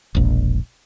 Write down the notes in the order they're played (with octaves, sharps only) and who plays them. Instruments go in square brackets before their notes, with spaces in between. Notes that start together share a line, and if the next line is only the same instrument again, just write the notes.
[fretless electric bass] E1 A#1